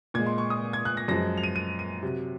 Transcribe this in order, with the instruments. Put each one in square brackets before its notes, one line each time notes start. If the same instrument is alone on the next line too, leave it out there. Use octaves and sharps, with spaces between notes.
[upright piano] A#2 G#6
G#3
C6
C#6
D#6
G#6
F#6
A#6
F#2 F3 G#3 A#6
F7
D#7
D#7
D#7
C3 F#3